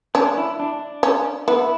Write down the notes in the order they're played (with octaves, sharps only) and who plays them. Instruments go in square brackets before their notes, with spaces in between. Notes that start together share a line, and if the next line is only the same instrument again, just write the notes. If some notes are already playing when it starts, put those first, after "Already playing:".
[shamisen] C#4 [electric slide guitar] D4
[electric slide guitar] E4
D4
[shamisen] C#4
[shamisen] B3 [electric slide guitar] E4